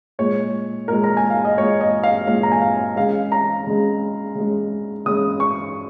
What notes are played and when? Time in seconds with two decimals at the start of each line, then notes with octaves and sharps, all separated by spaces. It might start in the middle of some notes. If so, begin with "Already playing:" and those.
0.19 A#2 G#3 C#5
0.88 A#2 G#3 A#4
1.04 A#5
1.17 G#5
1.30 F5
1.45 D#5
1.58 A#2 G#3 C#5
1.81 D#5
2.03 F5
2.27 A#2 G#3 F5
2.43 A#5
2.52 G#5
2.62 F5
2.96 C#3 G#3 F5
3.32 A#5
3.67 C#3 G#3
4.35 C#3 G#3
5.06 C#3 G#3 D#6
5.40 C#6